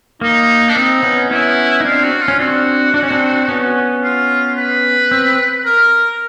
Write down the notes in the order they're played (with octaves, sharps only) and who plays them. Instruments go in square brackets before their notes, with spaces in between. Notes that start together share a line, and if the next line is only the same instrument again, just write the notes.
[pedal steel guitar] A#3 [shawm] D#4
[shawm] D4
[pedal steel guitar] C4 [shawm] D#4
[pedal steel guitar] B3 C#4
[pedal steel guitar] B3 C#4 [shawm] E4
[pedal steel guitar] D#4
[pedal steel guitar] C4 D4 [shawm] F4
[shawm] F#4
F4
[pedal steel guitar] C#4
[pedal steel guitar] C4 D4 [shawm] F#4
[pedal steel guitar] D4
C#4
C4 D4
B3 C#4
[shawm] F4
B4
[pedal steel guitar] C4
[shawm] A#4